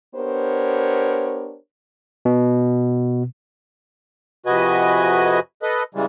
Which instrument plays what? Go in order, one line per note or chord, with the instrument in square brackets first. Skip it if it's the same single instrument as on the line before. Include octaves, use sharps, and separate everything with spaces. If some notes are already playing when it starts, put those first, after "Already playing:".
[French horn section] B3 D4 G4 A#4 C5 C#5
[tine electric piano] B2
[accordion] F2 C3 F#4 B4 D#5 G#5
A4 B4 D#5
C#3 E3 G3 G#3